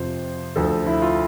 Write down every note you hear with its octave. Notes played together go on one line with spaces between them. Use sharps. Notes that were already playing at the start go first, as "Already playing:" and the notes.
Already playing: F2 C3 F3 C5
D2 D3 F3 A4
E4
F4